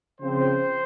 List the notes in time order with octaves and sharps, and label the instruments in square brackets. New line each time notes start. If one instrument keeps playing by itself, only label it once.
[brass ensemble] C#3 F3 C4 C5